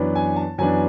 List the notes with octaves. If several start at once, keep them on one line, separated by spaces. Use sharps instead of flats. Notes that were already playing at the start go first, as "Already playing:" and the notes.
Already playing: F#2 E3 B3 D4
G#5
A5
F#2 E3 B3 D4 G#5